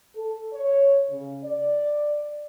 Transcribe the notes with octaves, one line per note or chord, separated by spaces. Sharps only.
A4
C#5
C#3
D5